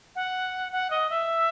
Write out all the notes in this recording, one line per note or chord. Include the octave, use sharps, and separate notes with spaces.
F#5
F#5
D#5
E5